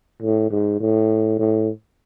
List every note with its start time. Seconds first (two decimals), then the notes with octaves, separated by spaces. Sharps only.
0.22 A2
0.51 G#2
0.80 A2
1.39 A2